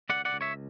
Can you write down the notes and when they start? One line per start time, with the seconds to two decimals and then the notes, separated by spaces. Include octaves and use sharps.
0.09 C#2 D5 F#5
0.25 D5 F#5
0.33 C#2
0.41 C#5 E5